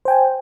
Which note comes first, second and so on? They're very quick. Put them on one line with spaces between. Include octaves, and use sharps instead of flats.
C5 G5 G#5